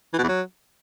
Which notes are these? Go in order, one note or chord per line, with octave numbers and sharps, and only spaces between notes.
E3
B2
E2
F#3